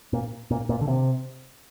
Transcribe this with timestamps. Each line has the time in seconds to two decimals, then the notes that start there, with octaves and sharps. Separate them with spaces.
0.13 A#2
0.51 A#2
0.69 A#2
0.81 D3
0.87 C3